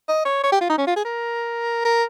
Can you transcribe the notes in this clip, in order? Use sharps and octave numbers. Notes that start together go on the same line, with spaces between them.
D#5
C#5
C#5
G4
F4
D#4
C#4
F4
G#4
A#4
A#4